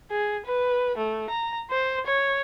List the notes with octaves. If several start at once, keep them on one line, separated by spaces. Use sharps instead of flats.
G#4
B4
A3
A#5
C5
C#5